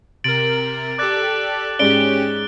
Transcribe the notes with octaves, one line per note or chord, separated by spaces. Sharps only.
C3 A#4 A6 D7 F#7
G4 A4 D5 D6 F#6 A6
G#2 G#3 C#4 G4 D5 D7 G7